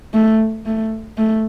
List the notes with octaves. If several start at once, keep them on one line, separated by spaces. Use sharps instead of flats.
A3
A3
A3